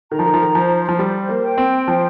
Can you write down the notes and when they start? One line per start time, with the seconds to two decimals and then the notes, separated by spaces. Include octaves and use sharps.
0.11 D#3 A#5
0.19 F3
0.26 D#3
0.34 F3
0.42 D#3
0.54 F3 C5
0.89 F3
0.99 G3 C5
1.29 A#3
1.42 G5
1.58 C4
1.88 F3 C5